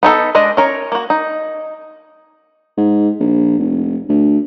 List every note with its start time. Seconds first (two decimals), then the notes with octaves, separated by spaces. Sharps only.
0.03 B3 D#4 A4
0.35 G#3 D4 D#5
0.57 C#4 A#4 C#5
0.92 A#3 F#4
1.10 D#4
2.77 G#2
3.20 A#1
3.58 F1
4.09 D2